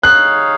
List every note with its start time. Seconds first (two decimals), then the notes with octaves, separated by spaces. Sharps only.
0.03 D#4 G#4 C#5 F5 F#6